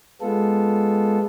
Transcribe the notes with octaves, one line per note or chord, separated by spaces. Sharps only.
G#3 B3 F4 A4